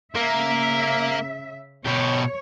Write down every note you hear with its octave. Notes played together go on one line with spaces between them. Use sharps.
C#3 A#3 A#4 E5
B2 G4 C#5